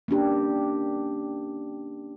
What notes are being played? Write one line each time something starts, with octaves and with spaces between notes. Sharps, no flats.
A#3 C#4 D4 G4